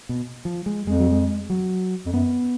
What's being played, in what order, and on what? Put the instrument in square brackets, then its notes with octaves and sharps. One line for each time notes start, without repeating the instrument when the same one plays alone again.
[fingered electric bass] B2
F3
G#3
[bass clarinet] F2 [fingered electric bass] G#3
[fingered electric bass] F#3
G#3
F#3
[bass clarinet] F2
[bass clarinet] F#2 [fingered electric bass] B3